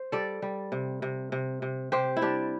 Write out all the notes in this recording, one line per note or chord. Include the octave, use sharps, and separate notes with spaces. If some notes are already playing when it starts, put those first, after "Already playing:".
Already playing: C5
G3 A4 D5
G3
C3
C3
C3
C3
C3 G4 C5
E4
G3 D4 G4